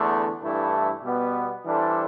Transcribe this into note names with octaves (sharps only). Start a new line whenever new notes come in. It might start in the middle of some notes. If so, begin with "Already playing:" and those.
Already playing: E2 D3 A3
G2 E3 A3 E4 A4
B2 G3 B3
E3 G3 D4 A4 C5